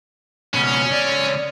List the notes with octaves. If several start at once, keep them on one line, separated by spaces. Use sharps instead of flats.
C#2 B2 C#4
C#2 D5